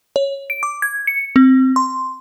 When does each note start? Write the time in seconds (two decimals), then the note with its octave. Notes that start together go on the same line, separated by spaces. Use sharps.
0.16 C#5
0.50 D7
0.63 D6
0.82 G#6
1.07 C#7
1.36 C4
1.76 C6